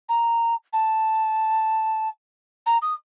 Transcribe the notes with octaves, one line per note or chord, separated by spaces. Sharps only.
A#5
A5
A#5
D#6